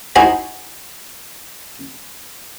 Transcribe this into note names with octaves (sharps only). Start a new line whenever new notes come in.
D#4 E4 F#4 C5 G#5